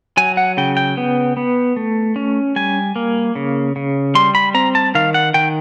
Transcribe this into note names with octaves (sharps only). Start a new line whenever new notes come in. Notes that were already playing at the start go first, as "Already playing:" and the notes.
F#3 G#5
F#5
C#3 G5
G5
B3
B3
A3
C#4
G3 G#5
A#3
C#3
C#3
G3 C6
B5
C4 A#5
A5
D#3 F5
F#5
D#3 G5